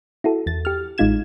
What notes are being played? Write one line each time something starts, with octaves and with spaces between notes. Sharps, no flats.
E4 F#4 A4
E2 A6
G4 F6
A1 G#3 D#4 F4 G#6 E7